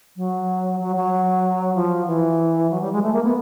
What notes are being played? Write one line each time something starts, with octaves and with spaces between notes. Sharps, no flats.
F#3
F#3
F#3
F3
E3
F#3
G3
G#3
A3
A#3
B3